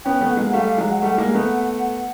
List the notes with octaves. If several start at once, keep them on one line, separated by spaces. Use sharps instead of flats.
B3 C#4 G5
A3 B3
F#5
G#3 A#3
G3 A3 F5
F5
F#3 G#3
F#5
G3 A3 F#5
G#3 A#3
A3 B3